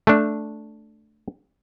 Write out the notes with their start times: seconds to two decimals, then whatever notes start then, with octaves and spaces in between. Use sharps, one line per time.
0.07 A3 D4